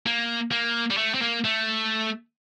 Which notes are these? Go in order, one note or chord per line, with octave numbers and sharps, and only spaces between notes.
A#3
A#3
G3
A3
C4
A#3
A3